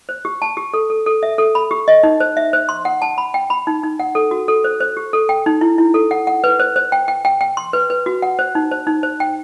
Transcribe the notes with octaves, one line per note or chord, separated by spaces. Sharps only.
C5
G4
A5
G4
A4
A4
A4
E5
A4
B5
G4
D#5
D#4
C5
E5
C5
C6
F#5
A5
B5
G5
B5
D#4
D#4
F#5
A4
F#4
A4
C5
C5
G4
A4
G5
D#4
E4
E4
A4
F#5
F#5
B4
C5
C5
G5
G5
G5
G5
C6
B4
B4
F#4
F#5
C5
D#4
C5
D#4
C5
G5